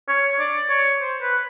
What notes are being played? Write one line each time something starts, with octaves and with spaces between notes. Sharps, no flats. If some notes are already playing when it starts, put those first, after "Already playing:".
C#5
D5
C#5
C5
B4